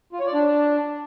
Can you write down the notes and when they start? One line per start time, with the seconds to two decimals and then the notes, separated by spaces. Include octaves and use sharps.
0.13 F4
0.20 C#5
0.27 D5
0.34 D4